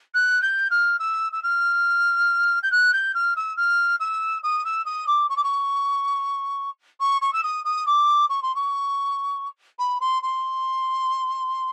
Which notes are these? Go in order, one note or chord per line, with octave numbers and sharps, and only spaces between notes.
F#6
G6
F6
E6
E6
F6
G6
F#6
G6
F6
E6
F6
E6
D#6
E6
D#6
D6
C#6
D6
C#6
C#6
C#6
E6
D#6
D#6
D6
C#6
C6
C#6
B5
C6
C6